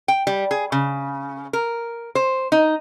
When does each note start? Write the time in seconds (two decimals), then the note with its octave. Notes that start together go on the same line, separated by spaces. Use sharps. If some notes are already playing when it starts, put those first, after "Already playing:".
0.08 G5
0.27 G3
0.51 G#4
0.72 C#3
1.53 A#4
2.15 C5
2.52 D#4